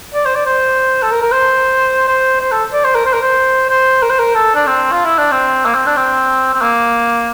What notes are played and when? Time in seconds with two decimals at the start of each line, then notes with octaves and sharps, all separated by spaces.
0.14 D5
0.25 C5
0.35 D5
0.46 C5
1.03 A4
1.11 A#4
1.22 A#4
1.32 C5
2.08 C5
2.41 C5
2.52 A4
2.73 D5
2.84 C5
2.95 A#4
3.06 C5
3.13 A#4
3.22 C5
3.70 C5
4.02 A#4
4.10 C5
4.19 A#4
4.35 A4
4.55 D4
4.67 C4
4.92 F4
5.04 E4
5.18 D4
5.31 C4
5.65 A#3
5.75 C4
5.86 D4
5.97 C4
6.54 C4
6.62 A#3